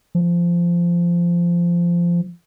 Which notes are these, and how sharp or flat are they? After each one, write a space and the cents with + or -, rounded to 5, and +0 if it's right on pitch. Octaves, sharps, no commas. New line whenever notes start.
F3 -15